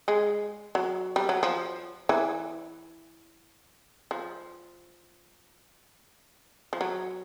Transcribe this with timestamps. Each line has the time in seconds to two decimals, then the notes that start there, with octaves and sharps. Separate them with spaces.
0.08 G#3
0.75 F#3
1.16 G3
1.29 F#3
1.43 F3
2.09 E3
4.11 F3
6.73 F3
6.81 F#3